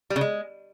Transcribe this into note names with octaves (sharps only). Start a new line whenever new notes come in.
G3
C#3
G#3